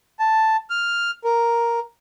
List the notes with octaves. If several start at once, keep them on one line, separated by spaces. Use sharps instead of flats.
A5
F6
A#4